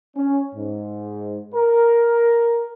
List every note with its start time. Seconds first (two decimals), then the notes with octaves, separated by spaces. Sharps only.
0.16 C#4
0.55 G#2
1.55 A#4